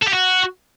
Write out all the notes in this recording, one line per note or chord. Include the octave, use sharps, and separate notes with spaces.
A4
G4
F#4